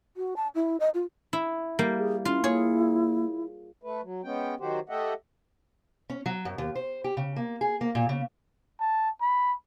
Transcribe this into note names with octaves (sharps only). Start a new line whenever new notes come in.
F#4
A5
E4
D#5
F4
E4
G3 A#3
G#4
C#4 E4 F4
A#3 G#4 C#5
A3 B4
F#3
G#3 B3 C#4 G5
D#3 F#3 F#4 G4 C5
A3 G4 A4 D#5 E5 F#5
C#4
F#3
F#2
D#2
C5
G4
C#3
A#3
G#4
A#3
A#2
C#3
A5
B5